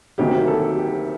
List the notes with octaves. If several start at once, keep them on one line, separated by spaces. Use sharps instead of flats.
D2 C3 D#3 F#3 A#3 G4
A4
G4